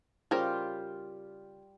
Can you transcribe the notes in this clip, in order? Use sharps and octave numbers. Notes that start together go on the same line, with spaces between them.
C#3 G3 F4 G4 A#4 C5